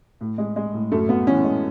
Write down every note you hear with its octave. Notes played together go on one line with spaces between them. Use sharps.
A2
G#3
G#3
A2
F#2 A3
F#2 B3
E3 C#4
G#3